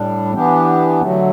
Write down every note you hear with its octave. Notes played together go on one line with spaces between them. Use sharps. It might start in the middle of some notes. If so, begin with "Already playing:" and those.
Already playing: A2 G3 D4
E3 B3 D4 G4
D3 F#3 A3